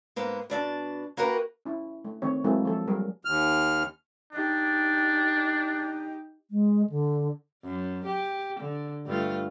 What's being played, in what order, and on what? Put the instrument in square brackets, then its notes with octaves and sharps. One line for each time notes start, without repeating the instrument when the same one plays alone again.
[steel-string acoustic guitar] G#2 A#3 B3
B2 D4 E5 A5
A#3 F#4 G4 A#4 B4
[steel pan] C#4 E4
A3
D#3 A3 C4 C#5
F#3 G#3 A#3 C4 E4 A4
F3 A4
F#3 G3 A#3 G#4 A#4
[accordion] D#2 F6
[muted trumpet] D4 [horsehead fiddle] D#4 G4
[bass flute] G#3
D3
[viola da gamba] F#2
G4
D3
G2 A3 F4